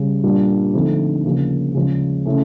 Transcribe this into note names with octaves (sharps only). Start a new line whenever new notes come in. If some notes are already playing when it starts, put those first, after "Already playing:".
Already playing: C#3 G3
A#2 G3 A#3 D4 F4
D3 F3 A3 C4 D#4
C#3 F3 A#3
C#3 F3 G#3
C#3 E3 A3 C#4